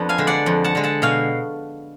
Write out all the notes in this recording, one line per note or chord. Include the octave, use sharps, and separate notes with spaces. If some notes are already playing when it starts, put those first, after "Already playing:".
Already playing: F2 B3 D4
F5 G#5
D3 G#3
D5 F#5
F2
F#5 A5
D3 G#3
F#5 A5
B2 F5 G#5